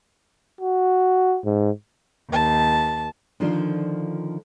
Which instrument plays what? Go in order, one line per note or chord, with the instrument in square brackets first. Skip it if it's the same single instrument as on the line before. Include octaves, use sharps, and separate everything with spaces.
[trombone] F#4
G#2
[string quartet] D#2 A5
[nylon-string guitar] D3 D#3 F3 D4 F4 A4